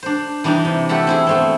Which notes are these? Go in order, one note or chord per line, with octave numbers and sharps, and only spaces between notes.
D4 C5
E3 G3 D4 D#4 G4
C3
A3 G4 A4 F#5 B5
C4 E4 G#4
B2 A3 C4